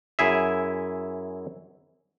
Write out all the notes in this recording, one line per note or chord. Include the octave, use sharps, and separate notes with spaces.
F#2 E4 G#4 E5